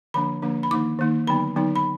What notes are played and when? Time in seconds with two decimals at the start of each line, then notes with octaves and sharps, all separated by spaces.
0.14 D3 F3 A#3 D4 B5
0.42 D3 F3 A#3 D4
0.63 B5
0.71 D#3 A#3 D#4 D6
0.99 D#3 A#3 D#4
1.27 D3 F#3 B3 D#4 B5
1.56 D3 F#3 B3 D#4
1.76 B5